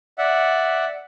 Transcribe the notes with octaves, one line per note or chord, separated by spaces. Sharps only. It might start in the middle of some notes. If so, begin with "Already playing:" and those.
D5 E5 F#5